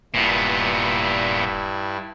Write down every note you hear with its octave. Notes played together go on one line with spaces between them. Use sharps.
D#1 G2 A#2 B3 E4